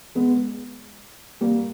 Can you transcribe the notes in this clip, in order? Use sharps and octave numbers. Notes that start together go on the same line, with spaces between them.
G#3 B3
G3 A#3